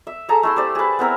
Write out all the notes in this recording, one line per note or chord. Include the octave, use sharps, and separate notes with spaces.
E5
G#4 A4 A5 A#5
A3 E4 C6
G4 C5 D5
G#4 B4
B3 C4 E4 A#4